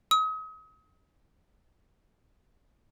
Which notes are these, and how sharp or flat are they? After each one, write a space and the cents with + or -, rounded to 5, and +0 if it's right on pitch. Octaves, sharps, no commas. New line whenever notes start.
D#6 +35